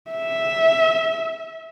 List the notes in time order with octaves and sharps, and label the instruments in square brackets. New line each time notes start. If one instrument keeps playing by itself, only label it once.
[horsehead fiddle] E5